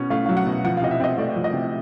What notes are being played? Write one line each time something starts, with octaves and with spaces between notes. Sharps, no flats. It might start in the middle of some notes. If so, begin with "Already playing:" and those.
Already playing: B2 C#4 F#5
A3 F5
F#3 F5
F#5
B2
F3 F#5
F5
C3 D#5
E5
C4 D#5
A3 D5
F3
D#5
C3